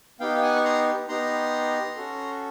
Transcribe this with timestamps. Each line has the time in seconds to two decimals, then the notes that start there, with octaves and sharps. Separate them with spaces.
0.20 B3 D#4 G4 F5 G5
0.42 F#5 G#5
0.55 C#6
0.64 A#5 C6
1.08 B3 D#4 G4 A#5 C6
1.96 C#4 F#4 A4